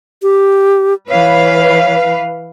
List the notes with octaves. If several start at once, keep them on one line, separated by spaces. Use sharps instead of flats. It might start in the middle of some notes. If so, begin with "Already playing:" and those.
G4
E3 B4 C#5 F5